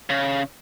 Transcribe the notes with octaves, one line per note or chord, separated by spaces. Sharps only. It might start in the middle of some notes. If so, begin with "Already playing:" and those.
C#3